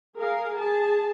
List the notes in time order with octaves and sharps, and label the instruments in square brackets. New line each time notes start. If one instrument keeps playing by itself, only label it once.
[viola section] G#4 A#4 F5
G#4 A5